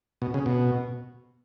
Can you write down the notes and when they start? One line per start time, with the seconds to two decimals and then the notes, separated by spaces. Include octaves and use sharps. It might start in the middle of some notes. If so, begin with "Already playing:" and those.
0.22 B2
0.34 C#3
0.46 B2